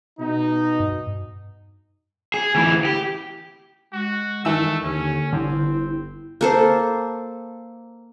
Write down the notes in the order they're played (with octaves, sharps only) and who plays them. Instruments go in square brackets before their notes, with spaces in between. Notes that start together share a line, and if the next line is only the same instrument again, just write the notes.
[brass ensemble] B2 D#4
[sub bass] G2
[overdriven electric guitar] G#4
D2 E3
G4
[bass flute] G#3 [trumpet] F#4
[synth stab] G2 E3 E6 [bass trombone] D#3 [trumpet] A3
[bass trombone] D#2 [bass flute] D3 [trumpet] C#4
[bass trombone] G1 [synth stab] D3 [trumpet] C4 [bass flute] E4
[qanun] A#3 A4 C5